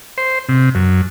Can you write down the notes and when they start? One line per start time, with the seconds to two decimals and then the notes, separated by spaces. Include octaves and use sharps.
0.18 C5
0.49 C3
0.75 F#2